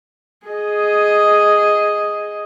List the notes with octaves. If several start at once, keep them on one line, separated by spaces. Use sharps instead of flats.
G#4 D#5